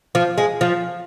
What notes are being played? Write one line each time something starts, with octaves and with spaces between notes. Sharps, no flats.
F3
G#3
F3